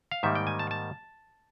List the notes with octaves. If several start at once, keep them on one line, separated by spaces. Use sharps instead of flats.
F5
G#2 D#3 G3 A#3 E5
G5
G#5
A5
A5